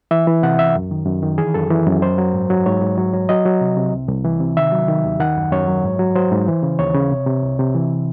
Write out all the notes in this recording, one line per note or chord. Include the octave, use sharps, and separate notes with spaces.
E3 E5
E3
C3 F#5
C2 E5
F#2
D#3
F#2
D#3
E3 G#4
F#2 A4
E3
F#2
F#3 C5
F#3
G#2
F#3
G#2 C#5
G#2
F#3
F#3
F#3 D#5
F#3
C3
C3
C2
C2
E3
C3
D#3 E5
F#3
D#3
D#2
D#3 F#5
F#2
F#2 C#5
F#3
G#2
F#3
F#3 C5
G#2
E3
C#3
D#2 C#5
C#3
C3
C3
C2
C3
E3